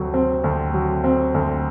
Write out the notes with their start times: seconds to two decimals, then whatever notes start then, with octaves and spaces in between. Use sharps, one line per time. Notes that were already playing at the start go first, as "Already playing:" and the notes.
Already playing: D2 C3 F#3
0.14 C4
0.44 D2
0.74 F#3
1.04 C4
1.34 D2